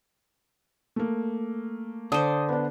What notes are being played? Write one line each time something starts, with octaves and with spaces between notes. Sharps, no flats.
A3 A#3
D3 C5 D#6
B3 D4